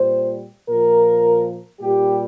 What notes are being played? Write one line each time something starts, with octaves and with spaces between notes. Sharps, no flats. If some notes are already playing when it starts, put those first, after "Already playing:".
Already playing: A#2 G3 C5
A#2 F3 A#4
A#2 G3 G4